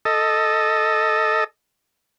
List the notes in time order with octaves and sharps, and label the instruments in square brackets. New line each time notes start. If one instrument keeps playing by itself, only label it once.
[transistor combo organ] A4 D#5